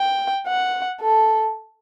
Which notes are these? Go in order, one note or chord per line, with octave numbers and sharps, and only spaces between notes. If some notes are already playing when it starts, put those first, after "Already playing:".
Already playing: G5
F#5
A4